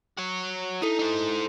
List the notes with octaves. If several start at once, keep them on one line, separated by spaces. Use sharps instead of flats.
F#4 C#5
D#4 E4 A4
D#4 C5